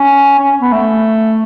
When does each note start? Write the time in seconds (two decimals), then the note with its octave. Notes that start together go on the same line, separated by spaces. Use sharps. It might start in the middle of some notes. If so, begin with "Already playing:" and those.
Already playing: C#4
0.39 C#4
0.61 B3
0.72 A3